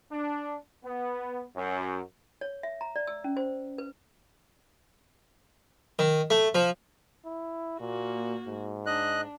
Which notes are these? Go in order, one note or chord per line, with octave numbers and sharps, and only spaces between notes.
D4
B3
F#2
C#5
E5
A#5
D5
E6
C#4
C5
B4
D#3
A3
F3
E4
A#2 A#3 F#4
G#2
D4 D#5 F#6